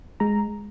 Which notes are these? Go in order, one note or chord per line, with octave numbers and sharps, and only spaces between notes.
G#3 A#5